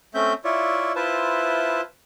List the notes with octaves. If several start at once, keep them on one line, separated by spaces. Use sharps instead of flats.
A3 C4 C#4 E5 G6
E4 F4 C#5 D5 E5
E4 F4 B4 C5 E5 A5